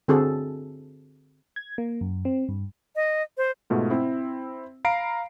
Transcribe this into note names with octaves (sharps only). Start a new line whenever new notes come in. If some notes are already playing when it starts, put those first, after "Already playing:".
D3 C4 F#4 G#4 A4
G#6
A#3
F#2
C4
G2
D#5
C5
G#2 B2 A3 F4
C4 E4
F5 A#5 B5 C7 D7